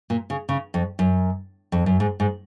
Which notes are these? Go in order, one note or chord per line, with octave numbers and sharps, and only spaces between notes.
A#2
C#3
C#3
F2
F#2
F2
F#2
G#2
G#2